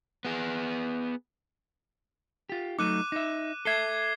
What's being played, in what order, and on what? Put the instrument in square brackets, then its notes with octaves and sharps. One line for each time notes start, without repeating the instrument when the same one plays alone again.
[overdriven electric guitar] B3 G#4
[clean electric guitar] F4 G4
[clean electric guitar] F#3 A3 D#4 [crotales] D6 F#6 D#7
[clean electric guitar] D#4 E5
[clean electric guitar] A4 E5 [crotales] G#6 C7 G7